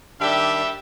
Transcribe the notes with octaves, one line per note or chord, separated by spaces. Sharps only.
D#3 G3 D4 G4 E5